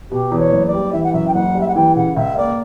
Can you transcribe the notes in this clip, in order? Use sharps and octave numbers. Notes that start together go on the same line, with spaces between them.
B2 G4
E2
C#5
F#1
D5
G3
E3 E5
F#5
F#2 E5
G5
F#1 F#5
G3
E5
F#5
E3 G5
C#3 F#5
C#2 E5
A#3 D5